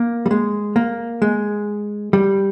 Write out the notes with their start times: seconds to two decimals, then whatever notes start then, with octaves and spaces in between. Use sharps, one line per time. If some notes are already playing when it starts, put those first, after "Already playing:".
Already playing: A#3
0.26 G3
0.31 G#3
0.76 A#3
1.22 G#3
2.13 G3